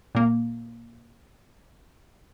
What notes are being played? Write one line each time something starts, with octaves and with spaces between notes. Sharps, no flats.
A#2 A#3